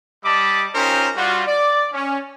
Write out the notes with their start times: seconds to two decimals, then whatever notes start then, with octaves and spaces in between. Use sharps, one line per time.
0.25 G3 D#5 A5 B5 D6
0.75 C#4 D#4 F4 G4 A#4 C5
1.16 G3 F4 F#4
1.47 D5
1.93 C#4